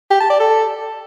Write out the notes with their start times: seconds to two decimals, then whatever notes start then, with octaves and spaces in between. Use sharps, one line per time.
0.11 G4
0.20 A5
0.30 D5
0.40 A4